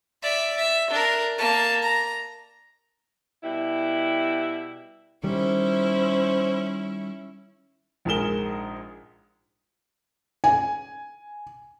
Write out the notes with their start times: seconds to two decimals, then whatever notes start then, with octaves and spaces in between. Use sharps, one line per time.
0.23 D5 E5
0.57 E5
0.91 D4 A#4
1.38 A#3 A5
1.83 A#5
3.43 B2 G3 E4
5.24 D#3 G3 C#4 E4 C5
8.05 A#1 G#2 G#4 A#4 E7 G7
10.44 G#5